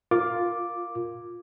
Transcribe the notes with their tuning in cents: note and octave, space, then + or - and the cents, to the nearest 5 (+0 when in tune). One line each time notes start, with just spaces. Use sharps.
F4 +10 A#4 +0 D6 +0